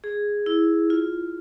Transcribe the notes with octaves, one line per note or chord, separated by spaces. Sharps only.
G#4
E4
F4